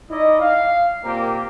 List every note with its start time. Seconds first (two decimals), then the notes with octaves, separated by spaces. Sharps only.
0.10 D#4 E4 D5 D#5
0.40 F5
1.04 A#2 A#3 C4 G4 A#4